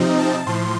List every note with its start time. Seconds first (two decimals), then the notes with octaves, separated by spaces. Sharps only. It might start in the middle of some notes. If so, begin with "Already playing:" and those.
Already playing: C3 F3 C4 D#4
0.19 A5
0.46 A2 F3 C6